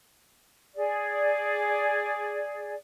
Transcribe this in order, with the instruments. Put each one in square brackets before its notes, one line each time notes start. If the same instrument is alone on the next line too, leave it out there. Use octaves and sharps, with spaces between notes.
[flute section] G#4 D5